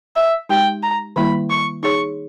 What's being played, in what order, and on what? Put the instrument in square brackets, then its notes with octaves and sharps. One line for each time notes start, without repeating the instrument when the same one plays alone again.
[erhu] E5
[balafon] G#3 D#4 G4 [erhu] G5
[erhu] A#5
[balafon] D#3 G3 A#3 E4 [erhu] B5
[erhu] C#6
[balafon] D#4 G#4 C#5 [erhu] C#6